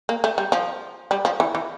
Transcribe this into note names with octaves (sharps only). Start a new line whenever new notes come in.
A#3
A3
G3
F3
G3
F3
E3
E3